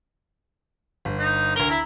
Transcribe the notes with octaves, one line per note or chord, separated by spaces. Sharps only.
G1
D#4
D2 A#4 G7
E4 A#5